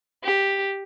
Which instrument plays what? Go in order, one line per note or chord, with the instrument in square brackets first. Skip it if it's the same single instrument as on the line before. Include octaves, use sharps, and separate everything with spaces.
[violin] G4